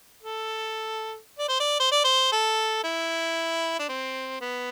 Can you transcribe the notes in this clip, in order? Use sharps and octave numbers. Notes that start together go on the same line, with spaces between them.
A4
D5
C5
D5
C5
D5
C5
A4
E4
D4
C4
B3